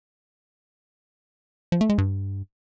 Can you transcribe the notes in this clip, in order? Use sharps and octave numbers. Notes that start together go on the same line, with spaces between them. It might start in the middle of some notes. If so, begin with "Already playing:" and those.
F3
A3
G#3
G2